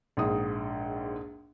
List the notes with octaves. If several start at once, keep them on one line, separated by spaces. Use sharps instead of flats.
A#1 G#2 D#6